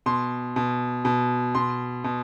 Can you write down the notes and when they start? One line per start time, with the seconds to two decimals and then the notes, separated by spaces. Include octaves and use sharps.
0.06 B2 C6
0.56 B2
1.05 B2
1.55 B2 C6
2.04 B2